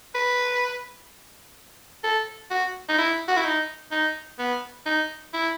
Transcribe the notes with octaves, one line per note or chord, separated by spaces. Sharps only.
B4
A4
F#4
D#4
E4
F#4
E4
D#4
D#4
B3
D#4
E4